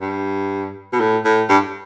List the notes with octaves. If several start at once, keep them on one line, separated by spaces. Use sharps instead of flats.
G2
B2
A2
A2
G2